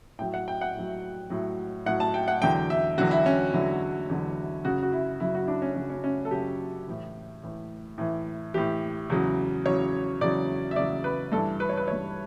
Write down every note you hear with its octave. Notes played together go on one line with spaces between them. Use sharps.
A2 F#3 G5
F#5
G5
F#5
A2 F#3
A2 F#3
A2 F#3 F#5
A5
G5
F#5
E2 D3 F#3 G5
E5
E2 D3 F#3 F#4
E4
C#4
E2 D3 F#3 E4
E2 D3 F#3
F#2 C#3 F#3 F#4
F#4
E4
F#2 C#3 F#3 E4
F#4
E4
D4
C#4
F#2 C#3 F#3 C#4
C#4
C#4
A4
F#2 C#3 F#3 G4
A2 E3
A2 E3
A2 E3
A2 E3 G4
E2 C#3 F#3
E2 C#3 F#3 C#5
E2 C#3 F#3 D5
E5
E2 C#3 F#3 D5
B4
G2 E3 A4
B4
C#5
B4
G2 E3 C#5